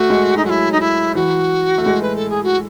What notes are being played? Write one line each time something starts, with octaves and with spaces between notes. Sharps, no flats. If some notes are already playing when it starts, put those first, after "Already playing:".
Already playing: A3 F#4
G#3
D#4
F#3 E4 F#4
D#4
E4
E3 F#4
A3
G#3
B4
A4
G#4
F#4